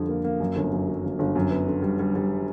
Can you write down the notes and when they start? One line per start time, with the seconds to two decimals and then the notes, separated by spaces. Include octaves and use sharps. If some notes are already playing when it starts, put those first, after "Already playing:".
Already playing: F2 D3 G3
0.09 A#3
0.24 A#3
0.40 F#2
0.56 G1
0.72 F#2
0.88 F#3
1.03 G1
1.19 G1
1.36 F#2
1.51 B3
1.67 D3
1.82 G3
1.99 G3
2.15 G3